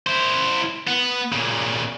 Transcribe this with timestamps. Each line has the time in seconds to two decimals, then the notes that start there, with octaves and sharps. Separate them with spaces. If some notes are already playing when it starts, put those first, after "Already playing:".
0.07 E4 C5
0.87 B3
1.33 A#2 C#3